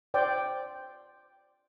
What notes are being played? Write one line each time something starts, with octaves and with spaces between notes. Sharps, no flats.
C5 D5 G5